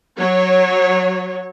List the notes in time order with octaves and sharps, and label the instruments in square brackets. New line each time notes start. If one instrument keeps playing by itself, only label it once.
[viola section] F#3 C#5